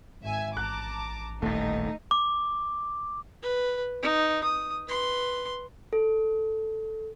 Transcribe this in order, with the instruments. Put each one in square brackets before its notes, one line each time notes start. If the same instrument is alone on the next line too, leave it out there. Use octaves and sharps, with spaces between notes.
[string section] G#1 E5 G#5
[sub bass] A1 [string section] A5 A#5 D6 [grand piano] F#6
[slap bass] D#1 A2 [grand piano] A3 [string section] D#4
[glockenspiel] D6
[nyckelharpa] B4
D#4
D#6
B4 C6
[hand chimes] A4